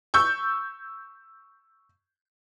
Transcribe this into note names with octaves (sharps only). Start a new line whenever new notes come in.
C#6 E6 G6